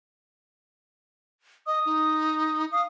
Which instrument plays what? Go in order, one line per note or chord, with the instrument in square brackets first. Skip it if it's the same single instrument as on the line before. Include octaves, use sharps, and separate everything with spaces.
[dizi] D#5 [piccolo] D#6
[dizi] D#4
[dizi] F5 [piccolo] D#6